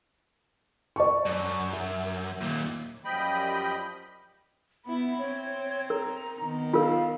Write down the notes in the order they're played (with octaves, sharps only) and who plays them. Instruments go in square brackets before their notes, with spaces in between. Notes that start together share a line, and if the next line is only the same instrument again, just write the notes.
[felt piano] D5 A5 C#6
[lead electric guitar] F#2
[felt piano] E5
[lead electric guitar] D#2 A#2
[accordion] F#2 F3 G3 D#5 G5 B5
[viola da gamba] B3 E4 [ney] B5
[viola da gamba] C4 [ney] C#5
[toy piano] A#4 [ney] A#5
[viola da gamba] D#3 B3
[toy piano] F4 A#4 [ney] F5